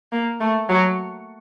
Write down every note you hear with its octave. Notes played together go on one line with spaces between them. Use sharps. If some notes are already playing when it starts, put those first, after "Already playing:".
A#3
A3
F#3